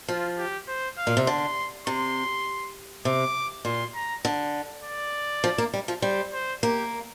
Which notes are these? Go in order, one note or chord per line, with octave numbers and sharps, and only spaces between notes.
F3 F4
G4
C5
F5
A#2
C3
D3 C6
C3 C6
C3 D6
A#2 C6
A#5
D3
D5
F3
A#3
G3
F3
G3 C5
C5
A#3 G4